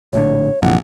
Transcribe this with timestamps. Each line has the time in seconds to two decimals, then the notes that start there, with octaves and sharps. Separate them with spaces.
0.13 A#1 A2 D3 C#5
0.62 A#1 F#2 C3 E3 F#5